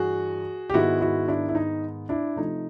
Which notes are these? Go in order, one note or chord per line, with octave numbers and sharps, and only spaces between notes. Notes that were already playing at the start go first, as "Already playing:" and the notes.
Already playing: G2 E3 F#4 G#4
G4
G#2 D#3 G#3 B3 E4 F#4
E4 F#4
D4 E4
E4
D#4
D4 E4
C3 F3 A3 D#4